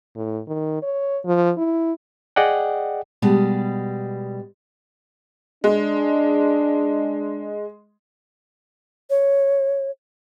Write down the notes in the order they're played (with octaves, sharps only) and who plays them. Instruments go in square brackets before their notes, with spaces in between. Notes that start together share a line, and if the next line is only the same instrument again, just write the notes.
[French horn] A2
D#3
C#5
F3
E4
[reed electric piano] G#4 D5 D#5 F#5 G5
[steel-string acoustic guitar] B2 G3 G#3
[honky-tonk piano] G#3 [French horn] D4
[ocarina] C#5